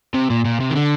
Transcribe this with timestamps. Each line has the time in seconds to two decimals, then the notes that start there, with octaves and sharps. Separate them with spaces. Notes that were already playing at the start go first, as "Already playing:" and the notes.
0.14 C3
0.30 A#2
0.45 A#2
0.60 C3
0.70 D#3
0.76 D3